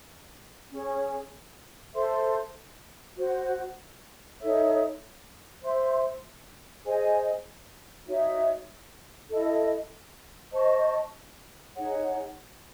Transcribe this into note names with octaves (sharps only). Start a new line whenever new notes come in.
C#4 G#4 C#5
A4 C5 E5 C6
F#4 C5 F#5
D#4 A4 C#5 E5
C5 E5 C6
G#4 C5 D#5 G#5
D#4 F#4 C#5 E5
E4 A4 D#5
C5 D#5 A5 C#6
D#4 G#4 C#5 F#5